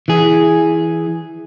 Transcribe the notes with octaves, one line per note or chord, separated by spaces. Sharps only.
E3 G#4